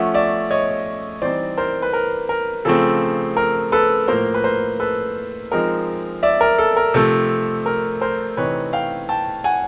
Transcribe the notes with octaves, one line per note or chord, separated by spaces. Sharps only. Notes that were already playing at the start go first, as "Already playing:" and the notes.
Already playing: F3 A3 C#4 E5 F#5
D5 E5
C#5 D#5
E3 G3 C4 D#4 C5 D5
A#4 C5
B4
A#4
A#4
C#3 F3 A3 C4 A4
A#4
A4 B4
A2 F3 A#3 A#4 C5
B4
A#4 C5
A4 B4
F3 G#3 C4 D#4 A#4
D5 E5
A#4
A4
A#4
C3 F3 A3 A4
A#4
A#4 C5
C3 E3 A3 C4 D#4 B4 C#5
F5 G5
G5 A5
F#5 G#5